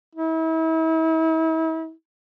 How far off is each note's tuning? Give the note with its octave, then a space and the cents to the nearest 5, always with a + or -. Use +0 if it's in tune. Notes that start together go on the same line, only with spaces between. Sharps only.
E4 -40